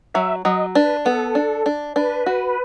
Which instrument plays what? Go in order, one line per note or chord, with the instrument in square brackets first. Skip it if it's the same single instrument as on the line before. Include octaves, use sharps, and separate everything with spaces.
[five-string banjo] F#3 [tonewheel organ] E5
[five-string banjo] F#3 [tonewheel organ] D#5
[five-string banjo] D4 [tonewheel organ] B4
[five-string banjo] B3 [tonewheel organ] A4
[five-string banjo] D4
D4
[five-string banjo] D4 [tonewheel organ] B4
[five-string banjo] F#4